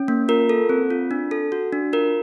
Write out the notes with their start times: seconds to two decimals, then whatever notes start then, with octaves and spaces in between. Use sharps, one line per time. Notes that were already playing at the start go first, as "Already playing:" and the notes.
Already playing: C#4
0.08 A#3
0.28 F4 A#4
0.49 A4
0.69 C4
0.90 F4
1.11 D4
1.31 A4
1.52 F#4
1.73 D4
1.93 F4 A#4